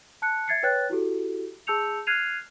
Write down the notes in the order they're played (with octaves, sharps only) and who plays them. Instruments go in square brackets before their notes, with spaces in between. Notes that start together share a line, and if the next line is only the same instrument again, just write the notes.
[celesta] A5 F#6 C#7
E5 G#6 A6 C7 C#7
B4 C#5 G5 F#6 A6
E4 F#4 G4 A4
G#4 A5 E6 G6 C#7 F7
F6 F#6 G#6 C7 D#7 F7